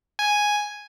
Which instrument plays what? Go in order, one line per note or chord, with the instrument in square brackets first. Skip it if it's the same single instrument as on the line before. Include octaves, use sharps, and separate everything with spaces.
[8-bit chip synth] G#5